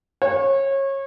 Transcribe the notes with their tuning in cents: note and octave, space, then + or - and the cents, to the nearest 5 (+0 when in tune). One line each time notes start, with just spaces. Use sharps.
C#5 -25